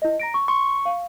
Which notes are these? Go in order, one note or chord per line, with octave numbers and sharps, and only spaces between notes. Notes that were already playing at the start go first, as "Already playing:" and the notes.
E4 D#5
A#5 A#6 D7
C#6
C6 C#6
F5